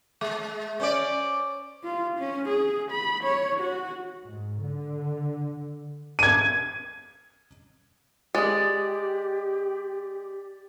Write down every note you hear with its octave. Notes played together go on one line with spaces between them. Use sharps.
G#3
C#4 C5 D5
F4
C#4
G#4
B5
C#5
F#4
G#2
D3
G#6 D#7
G#3 G4 D5 D#6